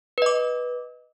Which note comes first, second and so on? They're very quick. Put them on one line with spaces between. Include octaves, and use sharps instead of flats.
B4 D#5 D6